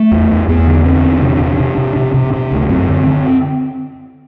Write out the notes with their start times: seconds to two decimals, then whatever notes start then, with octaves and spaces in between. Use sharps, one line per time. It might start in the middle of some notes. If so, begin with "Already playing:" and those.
Already playing: A3
0.11 E2
0.30 E2
0.48 E2 B3
0.67 D3
0.85 D3 C4
1.04 E2
1.22 C3 D4
1.40 C3
1.60 C3
1.78 C3
1.96 C3
2.14 C3
2.33 C3
2.52 D2
2.69 F#2 C4
2.88 D3
3.07 D3